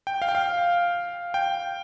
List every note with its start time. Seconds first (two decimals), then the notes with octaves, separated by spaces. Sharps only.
0.07 G5
0.22 F5
0.29 G5
0.35 F5
1.34 G5